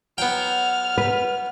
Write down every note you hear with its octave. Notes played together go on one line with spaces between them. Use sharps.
F#3 B3 G5 F6
B4